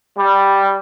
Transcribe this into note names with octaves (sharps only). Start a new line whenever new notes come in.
G3